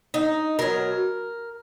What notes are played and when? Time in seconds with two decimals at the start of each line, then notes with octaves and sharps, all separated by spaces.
0.14 D#4
0.59 B2 F#3 A#4